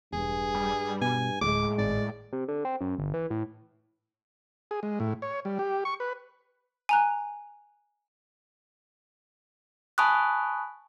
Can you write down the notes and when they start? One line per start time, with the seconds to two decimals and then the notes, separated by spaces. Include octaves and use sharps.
0.13 E1 G2 G#4
0.55 G3
1.01 B2 G#5
1.41 D1 A2 G#3 D6
1.78 G#1 D5
2.33 C3
2.48 D3
2.65 C4
2.81 F#2
2.98 G1
3.14 E3
3.30 A2
4.71 G#4
4.83 G#3
5.00 A2
5.22 C#5
5.45 G3
5.59 G4
5.85 C#6
6.00 B4
6.89 G#5 A#5 F#6
9.98 G#5 A5 B5 C#6 D#6 F#6